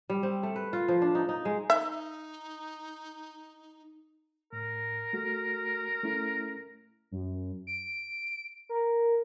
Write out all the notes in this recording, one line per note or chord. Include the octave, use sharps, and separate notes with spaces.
G3
C4
A3
B4
F4
F3
D4
D#4
D#4
G#3
D#4 E5
A2 A#4
A3 F#4
A3 C#4 E4
F#2
D7
A#4